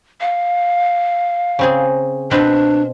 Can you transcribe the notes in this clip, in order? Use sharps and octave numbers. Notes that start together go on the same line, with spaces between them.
F5
C#3 C4 G#4
B2 C4 D4 B4